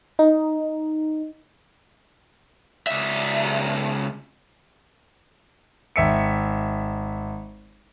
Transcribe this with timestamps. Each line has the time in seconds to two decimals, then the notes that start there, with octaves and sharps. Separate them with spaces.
0.19 D#4
2.87 C#2 E5
5.96 G#1 E5 C#7